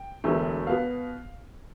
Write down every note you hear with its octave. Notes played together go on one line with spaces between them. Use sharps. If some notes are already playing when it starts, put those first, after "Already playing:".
Already playing: G5
E1 E2 D3 A3
B2 B3 F5